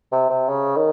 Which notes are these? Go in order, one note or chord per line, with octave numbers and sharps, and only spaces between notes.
C3
C3
C#3
D#3